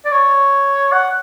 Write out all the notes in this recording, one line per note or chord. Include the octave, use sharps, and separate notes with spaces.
D5
C#5
F#5